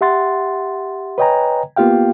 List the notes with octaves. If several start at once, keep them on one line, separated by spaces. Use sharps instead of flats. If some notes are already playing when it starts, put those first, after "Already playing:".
G4 E5 F#5 C6 A6
B4 C#5 D#5 G5 G#5 A#5
A#3 B3 F4 G4 F5 G5